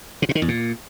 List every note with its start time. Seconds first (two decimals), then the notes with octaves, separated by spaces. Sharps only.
0.22 C3
0.29 A#2
0.35 D#3
0.42 E2
0.48 A#2